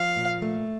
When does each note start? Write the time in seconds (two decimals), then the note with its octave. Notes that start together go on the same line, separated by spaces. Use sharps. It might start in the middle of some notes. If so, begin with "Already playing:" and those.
Already playing: F3 F5
0.17 A#2
0.42 A3